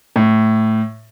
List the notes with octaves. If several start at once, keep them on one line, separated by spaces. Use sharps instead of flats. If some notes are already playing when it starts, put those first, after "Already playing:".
A2